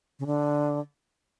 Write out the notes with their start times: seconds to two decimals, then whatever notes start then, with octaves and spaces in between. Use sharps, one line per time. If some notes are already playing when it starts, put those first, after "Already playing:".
0.19 C#3
0.26 D3